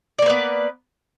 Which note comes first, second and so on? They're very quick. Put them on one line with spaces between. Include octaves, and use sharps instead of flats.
D5 A#3 B4 B3